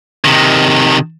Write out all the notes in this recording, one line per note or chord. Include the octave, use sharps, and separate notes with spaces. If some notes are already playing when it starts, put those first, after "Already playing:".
C3 D#3